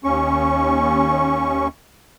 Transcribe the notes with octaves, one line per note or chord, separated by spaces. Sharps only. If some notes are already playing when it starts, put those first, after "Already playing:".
D#2 C#4 C#6